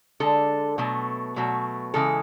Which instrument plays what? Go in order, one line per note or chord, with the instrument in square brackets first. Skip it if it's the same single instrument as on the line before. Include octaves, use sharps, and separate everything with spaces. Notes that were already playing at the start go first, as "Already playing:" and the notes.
[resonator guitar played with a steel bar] D3 G#3 A4
B2 F#3 A3
B2 F#3 A3
C#3 E3 G#3 A4